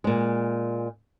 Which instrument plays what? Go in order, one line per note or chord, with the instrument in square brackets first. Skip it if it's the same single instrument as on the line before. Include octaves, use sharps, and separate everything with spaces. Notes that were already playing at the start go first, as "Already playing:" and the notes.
[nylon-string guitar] A#2 G#3